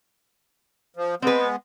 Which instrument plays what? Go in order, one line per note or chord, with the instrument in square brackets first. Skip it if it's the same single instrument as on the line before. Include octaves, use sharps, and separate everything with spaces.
[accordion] F3
[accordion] G#3 B3 [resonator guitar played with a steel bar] C4 B4